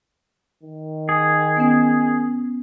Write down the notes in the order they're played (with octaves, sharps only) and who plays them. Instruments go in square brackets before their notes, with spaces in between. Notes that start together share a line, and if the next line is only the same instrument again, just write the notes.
[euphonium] D#3
[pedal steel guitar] G#4
[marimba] B3 C#4